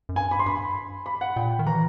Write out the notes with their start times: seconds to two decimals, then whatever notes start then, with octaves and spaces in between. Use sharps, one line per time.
0.09 F#2
0.16 G2 G#5
0.31 B5
0.39 C6
0.46 G2 B5
1.06 B5
1.21 F#5
1.36 A#2 G5
1.59 D#3
1.66 E3 A#5